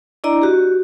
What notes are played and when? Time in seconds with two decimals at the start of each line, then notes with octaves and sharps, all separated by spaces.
0.24 D4 E4 D5 D#5 A#5
0.42 F#4 G4